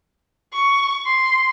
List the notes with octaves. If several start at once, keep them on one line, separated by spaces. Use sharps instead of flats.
C#6
C6